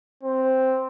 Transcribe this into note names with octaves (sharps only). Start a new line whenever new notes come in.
C4